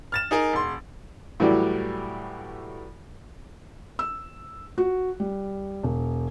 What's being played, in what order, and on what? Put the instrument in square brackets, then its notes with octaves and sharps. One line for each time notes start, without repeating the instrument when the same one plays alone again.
[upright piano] F6 A6 E7
D#4 G#4 A#4
E1 C6
[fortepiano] A2 E3 F#3 G3 D5
[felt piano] E6
F#4
G3
E1